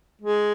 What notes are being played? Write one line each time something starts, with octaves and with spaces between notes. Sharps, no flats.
G#3